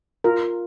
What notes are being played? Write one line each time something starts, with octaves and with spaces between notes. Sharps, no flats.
F4 A#4